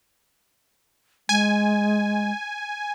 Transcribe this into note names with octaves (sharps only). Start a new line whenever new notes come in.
G#3 G#5